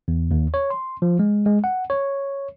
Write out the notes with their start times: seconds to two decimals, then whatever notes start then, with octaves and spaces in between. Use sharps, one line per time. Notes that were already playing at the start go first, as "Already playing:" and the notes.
0.08 E2
0.31 D#2
0.54 C#5
0.70 C6
1.02 F3
1.19 G#3
1.46 G#3
1.64 F#5
1.90 C#5